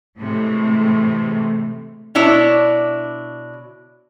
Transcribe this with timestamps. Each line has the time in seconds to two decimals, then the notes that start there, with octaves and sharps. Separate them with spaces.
0.18 A2 C3 E3 G#3 A3
2.15 B2 D4 E4 C#5